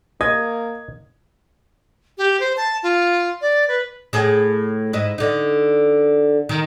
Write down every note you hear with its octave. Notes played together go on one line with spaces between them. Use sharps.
A#3 D#5 G#6
G4
C5
A5
F4
D5
B4
A2 G#4
G#2 E4 D#5
D3 D#4
D#3